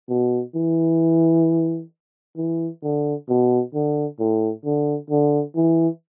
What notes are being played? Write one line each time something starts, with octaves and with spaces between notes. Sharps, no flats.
B2
E3
E3
D3
B2
D3
A2
D3
D3
E3